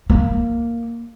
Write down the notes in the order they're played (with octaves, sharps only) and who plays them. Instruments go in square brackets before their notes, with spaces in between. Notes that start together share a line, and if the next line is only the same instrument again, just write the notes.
[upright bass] A#3